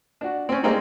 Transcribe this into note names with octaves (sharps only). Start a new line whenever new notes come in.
D4 F#4
C4 C#4
G3 G#3 A#3 C4 C#4 D#4